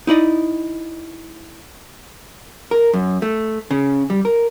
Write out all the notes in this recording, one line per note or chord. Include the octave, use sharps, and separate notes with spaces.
D#4 E4 D5 D#5
A#4
F#2
A3
C#3
G3
A#4